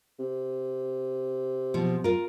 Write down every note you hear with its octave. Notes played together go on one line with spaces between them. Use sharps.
C3
B2 F3
F4 A#4